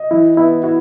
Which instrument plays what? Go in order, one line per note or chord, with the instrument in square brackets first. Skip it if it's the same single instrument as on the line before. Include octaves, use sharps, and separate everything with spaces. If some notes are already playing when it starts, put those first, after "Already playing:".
Already playing: [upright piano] D#5
[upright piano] E3 [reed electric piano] E4
[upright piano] B3 [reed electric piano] E4
[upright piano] E4 [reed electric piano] F#4